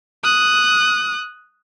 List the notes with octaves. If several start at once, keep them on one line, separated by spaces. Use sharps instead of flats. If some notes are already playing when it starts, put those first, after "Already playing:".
D#6 F#6